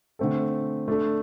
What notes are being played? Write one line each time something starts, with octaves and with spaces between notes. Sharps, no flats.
D3 A3 C4 A4
A3 D4 A4